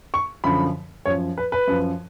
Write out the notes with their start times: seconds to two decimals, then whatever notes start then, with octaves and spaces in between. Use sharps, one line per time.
0.14 C#6
0.44 F#2 D3 F3 B5
1.05 F#2 F3 C#5
1.38 B4
1.52 B4
1.68 F#2 F3